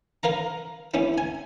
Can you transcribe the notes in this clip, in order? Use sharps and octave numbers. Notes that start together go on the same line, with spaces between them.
A#4 B4 F5 A#5
B3 C#4 E4
G#5